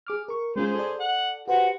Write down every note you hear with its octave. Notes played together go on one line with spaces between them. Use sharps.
G#4 D6 F6
A#4 C#6
G#3 C#4 F4 G#4 C5
A4 D5
F#5
F#4 G4 B4 C5 F#5